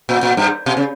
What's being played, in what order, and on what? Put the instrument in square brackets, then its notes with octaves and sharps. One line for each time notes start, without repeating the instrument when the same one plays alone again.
[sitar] A#2
A#2
G2
B2
C#3